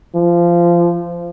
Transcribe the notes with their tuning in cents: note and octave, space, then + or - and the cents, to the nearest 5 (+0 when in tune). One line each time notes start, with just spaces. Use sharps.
F3 -20